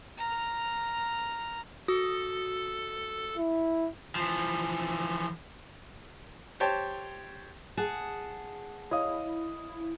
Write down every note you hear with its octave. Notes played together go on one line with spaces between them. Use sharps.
A#5 F6
F#4 A4 D#6
E4
E3 F3
G4 C5 C#5 G5 A5
G#4 F#5 A5
E4 C#5 D#5 F5 D#6